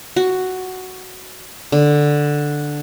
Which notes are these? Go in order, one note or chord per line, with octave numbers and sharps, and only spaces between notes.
F#4
D3